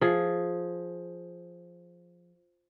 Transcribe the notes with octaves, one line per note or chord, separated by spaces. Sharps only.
F3 G#4